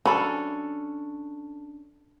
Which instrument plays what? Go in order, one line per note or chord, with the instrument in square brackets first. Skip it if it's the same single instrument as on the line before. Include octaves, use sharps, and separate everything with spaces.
[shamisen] F#3 B5 [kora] C#4 D4 A4